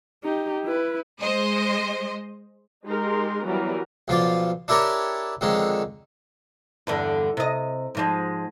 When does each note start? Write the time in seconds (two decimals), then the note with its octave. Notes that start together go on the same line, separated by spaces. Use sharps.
0.24 D#4 G4
0.65 E4 B4
1.21 G#3 C5 D#5
2.86 G#3 D#4 G4 A#4 C6
3.46 E3 F#3 G3 B3 A#4
4.08 B1 F3 F4 D5
4.68 D4 E4 G4 A#4 C#5 D5
5.41 F2 D3 D#3 G#3 C#4
6.87 E2 G2 D3
7.37 C3 D#5
7.95 G#2 F3 G#3